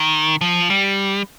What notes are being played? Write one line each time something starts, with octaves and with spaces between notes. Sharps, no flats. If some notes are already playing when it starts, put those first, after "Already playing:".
Already playing: D#3
F3
G3